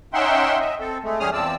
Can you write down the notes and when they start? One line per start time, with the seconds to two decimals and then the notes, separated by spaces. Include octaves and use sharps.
0.14 C#4 D#4 E5 F#5 G5 C6
0.60 D#5 E5
0.79 C4 A4
1.03 G#3 A3
1.20 E2 G3 C#4 G#4 D#6 F6
1.33 E2 F3 C4 D5 A5 E6